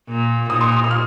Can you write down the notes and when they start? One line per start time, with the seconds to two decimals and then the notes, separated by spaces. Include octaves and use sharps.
0.09 A#2
0.49 A#2 D#6
0.61 C6
0.72 D#6
0.84 D#6
0.91 F6